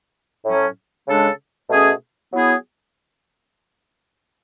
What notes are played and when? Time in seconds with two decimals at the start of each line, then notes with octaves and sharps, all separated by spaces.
0.44 A2 F#3 C#4
1.07 C#3 G#3 D4 A4
1.69 B2 A3 C#4 G#4
2.32 F#3 B3 E4 G#4